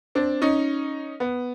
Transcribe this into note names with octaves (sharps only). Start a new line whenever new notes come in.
C4 D4
C#4 D#4
B3